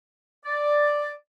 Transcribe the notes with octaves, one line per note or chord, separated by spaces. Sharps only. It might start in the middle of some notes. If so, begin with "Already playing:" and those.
D5